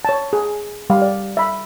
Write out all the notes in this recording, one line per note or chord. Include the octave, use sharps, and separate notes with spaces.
C#5 A5
G#4
G3 F5
D5
E5 B5